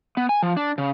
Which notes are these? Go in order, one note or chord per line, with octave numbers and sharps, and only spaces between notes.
B3
G#5
F3
D4
C#3